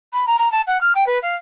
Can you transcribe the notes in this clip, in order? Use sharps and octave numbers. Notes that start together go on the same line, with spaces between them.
B5
A#5
A#5
A5
F#5
F6
G5
B4
F5